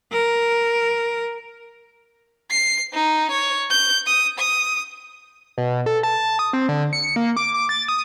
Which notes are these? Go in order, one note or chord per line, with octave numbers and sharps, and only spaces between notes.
A#4
C7
D#4
C#5
G6
D#6
D#6
B2
A4
A5
D#6
C4
D3
C#7
A#3
D6
D6
A6
D#6